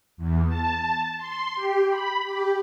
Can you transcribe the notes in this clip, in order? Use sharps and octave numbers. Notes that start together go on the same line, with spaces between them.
E2
A5
C6
G4
B5
G4